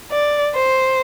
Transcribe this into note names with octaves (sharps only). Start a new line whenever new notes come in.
D5
C5